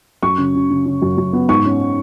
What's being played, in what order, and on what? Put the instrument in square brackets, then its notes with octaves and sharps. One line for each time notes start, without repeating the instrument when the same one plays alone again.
[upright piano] F#2 C#6
C#3
C#3
C#3
C#3
F#2
F#2
B3
G#2 C#6
C#4